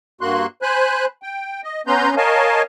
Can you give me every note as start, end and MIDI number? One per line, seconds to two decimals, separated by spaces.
0.21 0.46 43
0.21 0.46 58
0.21 0.46 66
0.21 0.46 84
0.21 0.46 90
0.62 1.05 72
0.62 1.05 80
0.62 1.05 83
0.62 1.05 90
1.23 1.61 79
1.64 1.81 75
1.87 2.15 59
1.87 2.15 61
1.87 2.15 71
1.87 2.15 82
1.87 2.15 84
1.87 2.15 91
2.17 2.62 70
2.17 2.62 73
2.17 2.62 75
2.17 2.62 77
2.17 2.62 80
2.17 2.62 81